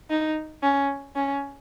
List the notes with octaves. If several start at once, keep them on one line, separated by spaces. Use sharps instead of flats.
D#4
C#4
C#4